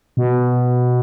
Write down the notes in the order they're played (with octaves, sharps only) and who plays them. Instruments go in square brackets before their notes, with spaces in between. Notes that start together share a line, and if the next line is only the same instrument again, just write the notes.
[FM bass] B2